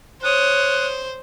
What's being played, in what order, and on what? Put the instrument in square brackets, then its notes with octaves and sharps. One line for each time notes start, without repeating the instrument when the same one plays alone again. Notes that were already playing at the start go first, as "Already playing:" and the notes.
[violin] C5 [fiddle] C#5 D#6 [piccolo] F#6